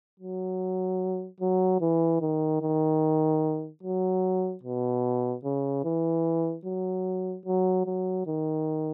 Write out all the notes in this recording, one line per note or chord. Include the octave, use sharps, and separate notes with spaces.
F#3
F#3
E3
D#3
D#3
F#3
B2
C#3
E3
F#3
F#3
F#3
D#3